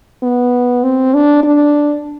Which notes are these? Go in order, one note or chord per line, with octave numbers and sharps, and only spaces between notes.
B3
C4
D4
D4